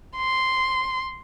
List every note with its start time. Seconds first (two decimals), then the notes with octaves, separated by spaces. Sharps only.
0.16 C6